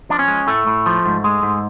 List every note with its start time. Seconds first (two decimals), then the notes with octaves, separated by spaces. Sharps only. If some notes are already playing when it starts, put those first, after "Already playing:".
0.09 F3 D4
0.19 C#4
0.28 G#3
0.47 A2 A3
0.67 A2
0.86 F3
1.06 G#2
1.24 G#3
1.43 G#2